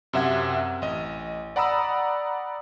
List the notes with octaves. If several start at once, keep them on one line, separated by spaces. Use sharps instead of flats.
F#2 C3 E5 F#5 G#6
A1 D#5
D5 F#5 A#5 B5 D#6 E6